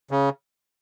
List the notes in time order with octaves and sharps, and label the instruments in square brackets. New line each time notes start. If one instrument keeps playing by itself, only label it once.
[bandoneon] C#3